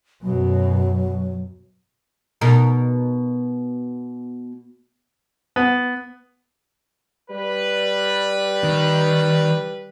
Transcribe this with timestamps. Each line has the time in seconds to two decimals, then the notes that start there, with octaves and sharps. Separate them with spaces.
0.23 F#2 B2 F#3
2.41 B2 D#4 A#4
5.56 B3
7.30 G3 B4
8.64 D#3